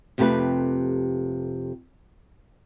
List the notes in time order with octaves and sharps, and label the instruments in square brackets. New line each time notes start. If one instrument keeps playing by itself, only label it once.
[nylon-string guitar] F2 C3 A3 E4 G4 B4